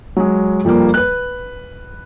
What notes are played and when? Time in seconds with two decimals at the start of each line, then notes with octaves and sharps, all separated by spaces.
0.16 F#3 G#3
0.64 F2 F3 G3 A#3
0.94 B4 F#6